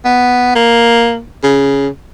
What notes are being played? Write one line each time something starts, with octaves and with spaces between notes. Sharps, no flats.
B3
A#3
C#3